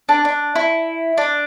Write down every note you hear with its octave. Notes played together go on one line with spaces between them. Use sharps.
D4
D4
E4
D4